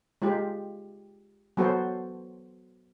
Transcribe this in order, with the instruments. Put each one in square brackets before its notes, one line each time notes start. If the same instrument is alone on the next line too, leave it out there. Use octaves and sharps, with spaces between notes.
[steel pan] G#3 F4 G4
F#3 B3 F#4 A4 C5